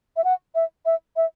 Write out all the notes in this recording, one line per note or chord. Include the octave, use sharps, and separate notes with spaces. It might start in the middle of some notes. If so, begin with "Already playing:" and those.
E5
F#5
E5
E5
E5